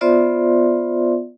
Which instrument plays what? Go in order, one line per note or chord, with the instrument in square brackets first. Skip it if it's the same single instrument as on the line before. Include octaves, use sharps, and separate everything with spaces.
[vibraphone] B3 F4 C5 D5 E5 C6